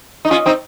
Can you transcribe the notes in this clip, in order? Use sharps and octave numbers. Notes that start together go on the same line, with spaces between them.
D#4
C#4 F4
C4 D#4